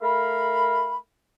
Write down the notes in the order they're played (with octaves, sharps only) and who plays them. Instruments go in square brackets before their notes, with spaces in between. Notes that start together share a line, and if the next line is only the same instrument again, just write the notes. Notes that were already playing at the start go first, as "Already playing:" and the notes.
[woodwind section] A3 A#4 F5 B5